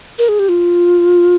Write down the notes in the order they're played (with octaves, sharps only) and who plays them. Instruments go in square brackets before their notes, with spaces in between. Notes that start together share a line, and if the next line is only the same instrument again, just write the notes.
[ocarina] A#4
G#4
G4
F4